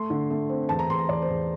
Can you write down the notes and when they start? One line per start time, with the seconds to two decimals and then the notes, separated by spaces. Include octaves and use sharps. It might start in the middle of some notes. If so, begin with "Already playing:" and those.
Already playing: A3 C6
0.10 D3
0.30 A3
0.49 C4
0.69 E2 A5
0.79 A#5
0.89 E2 C6
0.99 A#5
1.09 E2 D5
1.22 C5
1.29 E2